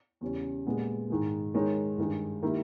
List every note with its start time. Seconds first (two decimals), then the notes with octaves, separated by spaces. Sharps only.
0.21 E2 C#3 G3 C#4
0.65 A#2 G#3 B3 G4
1.10 G#2 D#3 G#3
1.54 D#3 G#3 D#4 A#4 C#5
1.98 G2 D#3 G#3
2.42 D#3 A#3 E4 G4